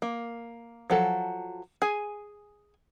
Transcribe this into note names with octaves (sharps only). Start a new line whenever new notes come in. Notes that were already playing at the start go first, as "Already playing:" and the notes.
A#3
F3 F#3 A4
G#4 G#5